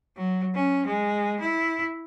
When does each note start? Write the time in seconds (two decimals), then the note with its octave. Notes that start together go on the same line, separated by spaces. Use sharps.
0.17 F#3
0.55 C#4
0.87 G#3
1.40 E4